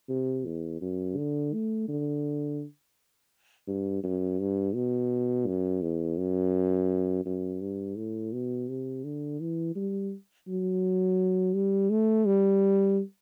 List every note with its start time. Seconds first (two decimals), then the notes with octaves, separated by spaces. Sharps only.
0.09 C3
0.45 E2
0.81 F#2
1.17 D3
1.53 A3
1.88 D3
3.67 G2
4.03 F#2
4.40 G2
4.75 B2
5.47 F#2
5.82 E2
6.18 F#2
7.25 F#2
7.61 G2
7.97 A2
8.33 B2
8.69 C3
9.04 D3
9.40 E3
9.76 G3
10.48 F#3
11.55 G3
11.91 A3
12.26 G3